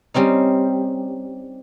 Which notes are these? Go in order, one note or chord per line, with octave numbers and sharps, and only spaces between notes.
G3 C4 C#4 D#4